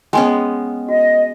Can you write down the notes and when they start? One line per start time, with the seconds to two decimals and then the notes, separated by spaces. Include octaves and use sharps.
0.13 G#3 B3 C#4 G5 G#5 C6
0.89 F#4 D#5